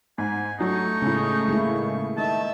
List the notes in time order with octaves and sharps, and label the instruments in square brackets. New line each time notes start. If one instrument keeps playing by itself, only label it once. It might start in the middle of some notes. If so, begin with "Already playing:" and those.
[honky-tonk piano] G#2 [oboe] G#5
[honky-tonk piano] F#3 D4 [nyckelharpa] A3 C#6 [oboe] D#4
[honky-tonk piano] A2 C#3 [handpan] G#3
[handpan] G#3 A#3 E4
[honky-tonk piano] D#3 [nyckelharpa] D#5 E5 [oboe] A5